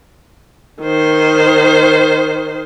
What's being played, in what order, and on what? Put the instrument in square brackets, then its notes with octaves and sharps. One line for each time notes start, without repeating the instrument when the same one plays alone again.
[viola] D#3 C5